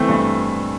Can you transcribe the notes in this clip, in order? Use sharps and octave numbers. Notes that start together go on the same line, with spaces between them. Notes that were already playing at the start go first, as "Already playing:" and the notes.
Already playing: E3 A3 C4
G2